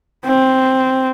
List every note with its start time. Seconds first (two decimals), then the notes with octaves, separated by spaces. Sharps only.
0.25 C4